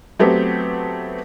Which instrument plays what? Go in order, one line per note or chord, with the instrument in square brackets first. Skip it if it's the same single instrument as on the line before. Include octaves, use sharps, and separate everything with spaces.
[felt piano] F#3 A3 B3 C4 G4